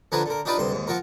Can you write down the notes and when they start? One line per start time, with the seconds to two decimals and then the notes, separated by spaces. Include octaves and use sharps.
0.12 D3 F3 D4 B4 G#5 A#5
0.26 D3 A#4
0.45 D4 D#4 F4 G4 B4 D5
0.58 D2 G2 C3 C6
0.71 D#2 G#2
0.87 F3 F4 F#4 A#4